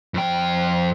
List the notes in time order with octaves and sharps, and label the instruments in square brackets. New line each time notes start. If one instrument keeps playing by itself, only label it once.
[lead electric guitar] F2 G5